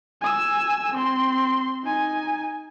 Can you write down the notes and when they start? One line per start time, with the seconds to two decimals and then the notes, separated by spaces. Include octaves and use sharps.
0.21 G#5 E6
0.94 C4 C6
1.84 D#4 G#5